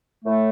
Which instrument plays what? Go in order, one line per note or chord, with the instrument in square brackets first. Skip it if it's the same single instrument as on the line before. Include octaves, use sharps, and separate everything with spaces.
[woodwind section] A2 A3